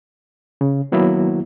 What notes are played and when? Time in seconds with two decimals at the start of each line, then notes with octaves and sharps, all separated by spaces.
0.61 C#3
0.92 D#3 F#3 A#3 B3 E4 F#4